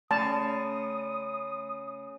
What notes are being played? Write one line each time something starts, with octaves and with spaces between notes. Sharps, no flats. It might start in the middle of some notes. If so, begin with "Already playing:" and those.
C#3 A3 A5 D#6